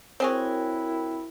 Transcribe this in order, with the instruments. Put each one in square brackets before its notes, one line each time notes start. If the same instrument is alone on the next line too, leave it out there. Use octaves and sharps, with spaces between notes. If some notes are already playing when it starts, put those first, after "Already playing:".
[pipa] C4 G#4 C#5 [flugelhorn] E4 [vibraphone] F#4 A#4 G5 [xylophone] C5